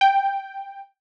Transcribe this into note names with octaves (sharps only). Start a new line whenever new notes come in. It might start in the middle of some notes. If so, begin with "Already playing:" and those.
G5